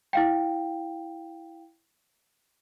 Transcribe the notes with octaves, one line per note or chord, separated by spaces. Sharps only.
E4 F5 G5